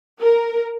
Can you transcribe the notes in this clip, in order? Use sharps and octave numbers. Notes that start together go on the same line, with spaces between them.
A#4